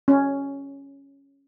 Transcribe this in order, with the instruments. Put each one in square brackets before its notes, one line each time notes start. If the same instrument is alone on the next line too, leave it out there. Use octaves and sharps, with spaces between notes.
[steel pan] C#4